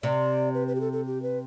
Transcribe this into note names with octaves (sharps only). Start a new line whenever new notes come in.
C3 D5
B4
B4
G4
A4
A4
G4
B4